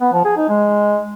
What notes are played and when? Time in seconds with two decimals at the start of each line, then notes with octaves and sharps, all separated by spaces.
0.01 B3
0.13 F3
0.25 G#4
0.37 D#4
0.49 G#3